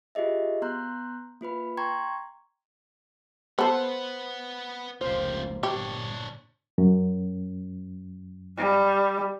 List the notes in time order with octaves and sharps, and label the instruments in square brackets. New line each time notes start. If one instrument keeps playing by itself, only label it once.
[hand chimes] F4 G4 G#4 D#5 E5
B3 A#5 C6 F#6 G6
A#3 F4 B4 B5
G5 A#5 C6 C#6 G#6
[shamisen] B3 A4 [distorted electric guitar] B4 F#5 [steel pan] C5
[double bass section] F1 C#2 A#3 [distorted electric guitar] F4 G4 [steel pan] C5
[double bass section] G1 A#2 [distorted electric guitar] D4 C#5 [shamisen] G4
[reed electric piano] F#2
[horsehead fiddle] G3